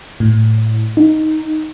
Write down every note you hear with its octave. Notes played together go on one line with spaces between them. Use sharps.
A2
D#4